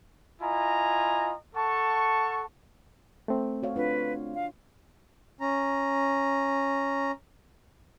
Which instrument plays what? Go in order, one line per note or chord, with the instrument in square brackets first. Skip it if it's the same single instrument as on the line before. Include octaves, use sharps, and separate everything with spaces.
[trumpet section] E4 F4 D#5 G#5 A#5
A4 F#5 A5 C#6
[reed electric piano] A3 C4
[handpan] F#4 C#5 F5
[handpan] D4 F4 [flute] B4
[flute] F5
[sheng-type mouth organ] C#4 A#5